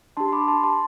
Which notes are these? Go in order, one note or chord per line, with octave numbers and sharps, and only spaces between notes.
D4 G4 A5 C6
C6
B5 D6
A5 C6
A5 C6